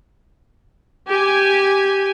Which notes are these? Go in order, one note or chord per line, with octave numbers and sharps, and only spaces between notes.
G4 G#5